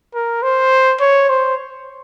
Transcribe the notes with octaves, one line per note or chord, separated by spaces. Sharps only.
A#4
C5
C#5
C5